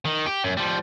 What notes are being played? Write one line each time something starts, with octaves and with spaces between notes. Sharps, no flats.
D#3
G4
F#2
F3 G3